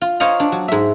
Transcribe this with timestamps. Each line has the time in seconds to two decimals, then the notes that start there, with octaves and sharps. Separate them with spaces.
0.01 F4
0.20 C5 C#5 D#5 F5 A#5
0.40 D4
0.52 F#3
0.68 G#2 E5